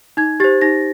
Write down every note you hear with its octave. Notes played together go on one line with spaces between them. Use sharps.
D#4 G#6
G4 C5 A6
D#4 A#6